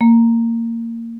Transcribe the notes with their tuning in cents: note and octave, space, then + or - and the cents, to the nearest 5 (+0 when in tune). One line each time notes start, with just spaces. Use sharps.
A#3 -20